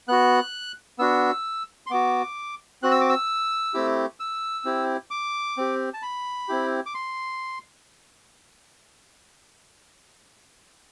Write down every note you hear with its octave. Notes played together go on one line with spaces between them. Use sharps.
B3 F#4 F#6
B3 D4 F#4 E6
C6
B3 F#4 D6
C4 F#4 F#6
E6
D6
E6
A3 C4 E4 G4
E6
C4 E4 G4
D6
C4 G4
A5
B5
C4 E4 G4
D6
C6